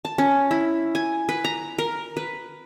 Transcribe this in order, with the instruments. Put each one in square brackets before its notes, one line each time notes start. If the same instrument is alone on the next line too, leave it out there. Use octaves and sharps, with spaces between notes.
[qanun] A5
C#4
E4
G#5
B4
A#5
A#4
B4